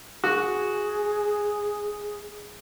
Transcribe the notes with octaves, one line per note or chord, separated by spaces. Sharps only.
F#4 G#4